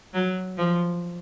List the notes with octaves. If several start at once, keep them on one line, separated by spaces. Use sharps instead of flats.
F#3
F3